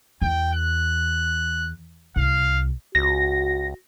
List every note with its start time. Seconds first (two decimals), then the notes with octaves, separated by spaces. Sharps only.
0.22 E2 G5
0.53 F#6
2.16 C2 F5
2.95 C#2 F#4 A#6